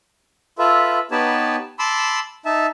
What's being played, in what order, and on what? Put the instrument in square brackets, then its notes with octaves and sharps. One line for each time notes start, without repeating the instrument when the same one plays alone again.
[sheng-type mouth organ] F4 A4 B4 E5
B3 D#4 G4 B4 C#5 A5
A5 B5 C6 D6 E6
D#4 E5 A5